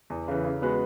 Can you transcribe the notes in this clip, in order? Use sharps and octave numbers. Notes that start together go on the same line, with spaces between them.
E2
C#3 E3
C#3
G#3 B3 F#4 B4